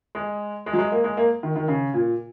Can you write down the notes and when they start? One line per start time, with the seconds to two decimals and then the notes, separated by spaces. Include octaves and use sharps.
0.15 G#3
0.66 G#3
0.73 F#3
0.78 G#3
0.92 A#3
1.04 G#3
1.17 A#3
1.43 D#3
1.56 D#3
1.68 C#3
1.94 A#2